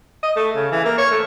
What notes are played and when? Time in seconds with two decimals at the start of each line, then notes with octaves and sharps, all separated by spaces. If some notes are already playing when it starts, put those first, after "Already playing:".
0.23 D#5
0.36 A3
0.56 C#3
0.71 E3
0.85 A#3
0.98 C#5
1.11 A3